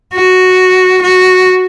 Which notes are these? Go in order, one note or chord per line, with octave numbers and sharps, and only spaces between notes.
F#4
F#4